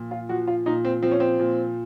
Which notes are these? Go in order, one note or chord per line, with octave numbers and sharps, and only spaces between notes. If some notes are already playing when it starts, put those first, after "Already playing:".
Already playing: A#2 F3
F4
F3 F#4
F4
A#2 D#4
C4
F3 C4
C#4
C4
A#2